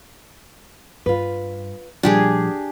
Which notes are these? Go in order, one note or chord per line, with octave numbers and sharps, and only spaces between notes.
G2 F4 B4
A#2 F3 G3 D4 G4 G#4